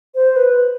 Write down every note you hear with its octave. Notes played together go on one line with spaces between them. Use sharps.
C5
B4